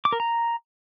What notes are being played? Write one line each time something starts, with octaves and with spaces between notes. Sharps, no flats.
D6
A#4
A#5